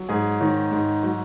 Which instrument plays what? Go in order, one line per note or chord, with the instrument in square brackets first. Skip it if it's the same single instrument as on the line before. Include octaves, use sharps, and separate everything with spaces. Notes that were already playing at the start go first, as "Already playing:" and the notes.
Already playing: [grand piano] F#3
G#2 G#4
D#3 C#5
G#2
F#3